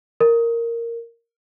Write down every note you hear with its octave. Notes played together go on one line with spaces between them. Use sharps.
A#4